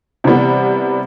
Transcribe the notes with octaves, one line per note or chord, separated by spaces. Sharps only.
C3 E3 G3 B3